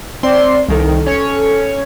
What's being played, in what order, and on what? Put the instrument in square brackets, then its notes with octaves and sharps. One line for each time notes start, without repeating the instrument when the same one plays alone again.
[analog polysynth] C4 C6 [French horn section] D5
[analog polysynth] C2 D#3 [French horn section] A4
[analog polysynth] C#4 C#5